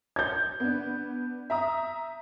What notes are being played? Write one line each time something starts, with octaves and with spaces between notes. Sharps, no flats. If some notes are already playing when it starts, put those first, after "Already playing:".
G6 G#6
B3 D4
E5 A#5 D#6